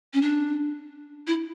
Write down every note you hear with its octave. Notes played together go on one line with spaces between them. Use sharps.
C#4
D4
E4